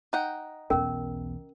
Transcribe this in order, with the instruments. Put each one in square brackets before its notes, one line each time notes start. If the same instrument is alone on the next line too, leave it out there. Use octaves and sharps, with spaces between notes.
[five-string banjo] D#4 F#5 G5
[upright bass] B1 E2 [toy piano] C#4 A#4